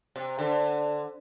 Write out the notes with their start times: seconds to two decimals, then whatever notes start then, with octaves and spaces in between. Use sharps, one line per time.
0.16 C3
0.39 D3